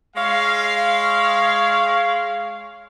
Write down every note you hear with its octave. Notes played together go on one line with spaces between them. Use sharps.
G#3 C#5 F5